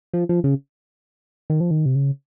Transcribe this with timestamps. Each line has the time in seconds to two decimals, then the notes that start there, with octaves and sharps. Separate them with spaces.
0.13 F3
0.29 F3
0.44 C#3
1.50 D#3
1.60 F3
1.71 D#3
1.86 C3
1.95 C#3